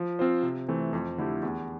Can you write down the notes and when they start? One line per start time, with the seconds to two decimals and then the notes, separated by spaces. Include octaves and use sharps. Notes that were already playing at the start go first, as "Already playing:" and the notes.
Already playing: F3
0.19 C4 F4 C5
0.43 C3
0.68 E3 A3 C4
0.93 F2
1.18 D3 A3 E4 G4
1.43 E2